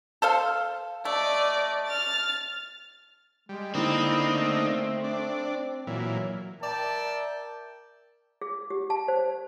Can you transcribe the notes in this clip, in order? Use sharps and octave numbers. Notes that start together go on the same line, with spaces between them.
A4 C5 F5
A3 D5 D#5
F6 A6
G3 G#3
D3 A#3 C4 D#4 E4
A3
D4
A#2 E3 F#3
A#4 D5 E5 G5 A5
G#4
G4
A5
C5